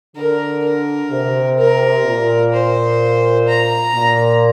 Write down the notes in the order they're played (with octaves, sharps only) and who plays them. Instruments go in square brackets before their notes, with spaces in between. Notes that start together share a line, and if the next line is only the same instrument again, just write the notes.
[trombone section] D3 [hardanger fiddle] A#4
[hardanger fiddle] A#4
[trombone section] C3
[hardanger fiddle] A#4
[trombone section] A#2
[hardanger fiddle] C5
A#5
[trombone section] A#2